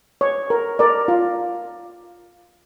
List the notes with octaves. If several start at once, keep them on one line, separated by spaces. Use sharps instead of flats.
C#5
A#4
A#4 D5
F4